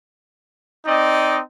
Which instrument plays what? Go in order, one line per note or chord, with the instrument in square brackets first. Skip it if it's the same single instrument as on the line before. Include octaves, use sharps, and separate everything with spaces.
[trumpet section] C4 D#4 D5 D#5